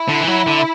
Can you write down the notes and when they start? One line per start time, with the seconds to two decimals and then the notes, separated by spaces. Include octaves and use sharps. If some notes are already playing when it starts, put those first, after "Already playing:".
Already playing: E4
0.09 D3
0.21 E3
0.27 F#3
0.47 D3